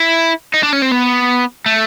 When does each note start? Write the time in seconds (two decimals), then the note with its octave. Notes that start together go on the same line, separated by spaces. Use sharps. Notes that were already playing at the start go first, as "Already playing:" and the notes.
Already playing: E4
0.54 D#4
0.63 D4
0.72 C#4
0.82 C4
0.91 B3
1.66 A3